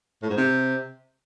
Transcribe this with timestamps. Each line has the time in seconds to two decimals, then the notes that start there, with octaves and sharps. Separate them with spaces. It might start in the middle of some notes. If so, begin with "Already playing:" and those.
0.23 A2
0.30 G#2
0.37 C3